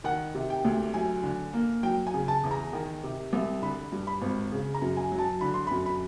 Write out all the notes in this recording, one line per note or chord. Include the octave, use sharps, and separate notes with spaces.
D#3 F#5
C3
G5
D2
F#3 G#5
D3
A#3
F#3 G5
G#5
C#3
A5
E2
A#5
D#3
C3
C2
D3 B5
G2
B5
G#1
C#3
A#5
F#2
G#5
F#3
A5
D3 B5
C6
F#2 B5
B5